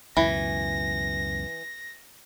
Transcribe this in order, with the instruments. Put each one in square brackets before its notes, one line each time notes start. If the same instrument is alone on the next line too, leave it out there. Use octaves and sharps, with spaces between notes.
[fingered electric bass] C#2 F#2 B2 [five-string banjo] E3 [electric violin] A#6